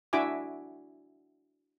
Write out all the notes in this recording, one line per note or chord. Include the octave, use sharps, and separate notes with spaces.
D4 E4 F#4 E5 G#5 D6